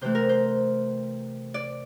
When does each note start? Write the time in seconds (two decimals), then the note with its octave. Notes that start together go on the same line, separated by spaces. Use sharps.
0.01 C3 E3 A3 C5
0.15 A#4
0.29 C5
1.54 D5